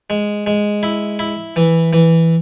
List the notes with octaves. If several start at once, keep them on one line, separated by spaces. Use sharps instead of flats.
G#3
G#3
E4
E4
E3
E3